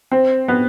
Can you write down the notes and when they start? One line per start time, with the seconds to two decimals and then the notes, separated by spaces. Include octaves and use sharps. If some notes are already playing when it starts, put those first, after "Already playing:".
0.12 C4
0.48 B3